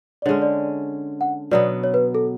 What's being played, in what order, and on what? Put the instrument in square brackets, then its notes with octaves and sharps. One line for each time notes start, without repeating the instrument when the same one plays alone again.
[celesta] D5
[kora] D3 G#3 C#4 [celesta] C#5
[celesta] D5
F#5
[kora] B2 F#3 B3 [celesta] D5
[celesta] C#5
B4
A4